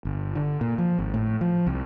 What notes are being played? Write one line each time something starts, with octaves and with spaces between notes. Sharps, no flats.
G1
D3
A#2
F3
G#1
A2
F3
C2